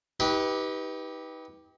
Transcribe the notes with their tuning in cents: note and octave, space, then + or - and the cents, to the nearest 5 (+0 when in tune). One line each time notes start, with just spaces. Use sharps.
D#4 +35 G4 +0 B4 -10